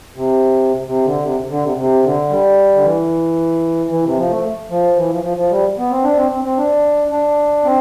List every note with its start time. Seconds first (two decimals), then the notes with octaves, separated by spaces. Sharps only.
0.16 C3
0.87 C3
1.05 D3
1.23 C3
1.50 D3
1.64 C3
1.77 C3
2.04 D3
2.30 G3
2.75 D3
2.84 E3
3.91 E3
4.05 C3
4.17 F3
4.30 A3
4.70 F3
4.97 E3
5.11 F3
5.24 F3
5.38 F3
5.51 G3
5.78 B3
5.91 C4
6.04 D4
6.17 C4
6.32 C4
6.44 C4
6.58 D4
7.11 D4
7.65 C4